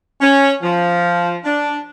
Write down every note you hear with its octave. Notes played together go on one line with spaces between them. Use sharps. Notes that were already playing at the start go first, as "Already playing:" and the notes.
C#4
F3
D4